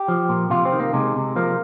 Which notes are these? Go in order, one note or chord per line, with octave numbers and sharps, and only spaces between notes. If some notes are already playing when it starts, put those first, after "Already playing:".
Already playing: G4
F3
A#2
C3 F4
C4
D#3
A#3
C3 G#3
C3
F3 A#3